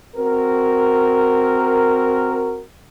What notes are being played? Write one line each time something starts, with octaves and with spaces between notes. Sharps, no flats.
C4 F#4 A#4